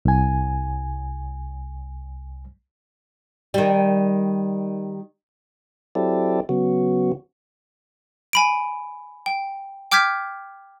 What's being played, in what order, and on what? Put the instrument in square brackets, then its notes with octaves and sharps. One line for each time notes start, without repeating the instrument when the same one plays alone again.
[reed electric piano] C2 G#5
[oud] D#3 G3
[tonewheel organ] F#3 C4 E4 G4 A4 D5
C#3 F#3 B3 F#4
[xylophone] G#5 B5 D7
G5
G5 D6 F6 G6 G#6 B6